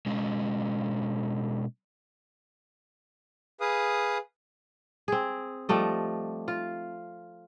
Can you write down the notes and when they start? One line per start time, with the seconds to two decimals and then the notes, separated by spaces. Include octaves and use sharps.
0.06 B2 G#3 C#4
3.61 G#4 B4 F5 D#6
5.08 C4 G#4
5.69 F3 G3 A3 D#5
6.48 F4